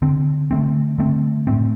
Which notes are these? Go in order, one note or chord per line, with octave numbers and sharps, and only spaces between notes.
D3 C4
D3 A3 C4
D3 A3 C4
A2 A3 C4